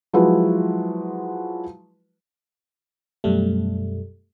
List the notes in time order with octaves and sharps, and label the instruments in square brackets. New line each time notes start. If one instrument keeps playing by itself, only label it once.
[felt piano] F3 F#3 G#3 E4 B4
[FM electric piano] F#2 B2 G3 A3